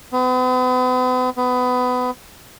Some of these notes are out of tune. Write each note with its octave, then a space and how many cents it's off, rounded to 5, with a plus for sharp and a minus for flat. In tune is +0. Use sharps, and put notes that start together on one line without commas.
B3 +45
B3 +25